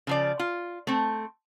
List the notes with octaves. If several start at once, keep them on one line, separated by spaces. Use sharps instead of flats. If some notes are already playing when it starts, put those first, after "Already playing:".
C#3 F3 D5
F4
A3 C4